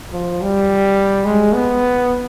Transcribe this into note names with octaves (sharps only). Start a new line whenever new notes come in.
F3
G3
G#3
B3